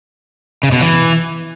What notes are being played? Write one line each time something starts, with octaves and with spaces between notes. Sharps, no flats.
C#3
B2
E3